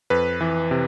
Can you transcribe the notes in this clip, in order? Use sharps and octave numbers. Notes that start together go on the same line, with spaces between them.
F2 B4
E3
C3